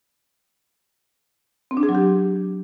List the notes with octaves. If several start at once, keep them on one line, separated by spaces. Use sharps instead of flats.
C4
D4
G#4
F#3
G4